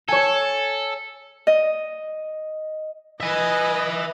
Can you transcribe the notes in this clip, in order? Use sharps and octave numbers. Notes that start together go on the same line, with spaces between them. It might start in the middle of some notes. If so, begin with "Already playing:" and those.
A4 C#5 G#5
D#5
B4 D#5 E5 G#5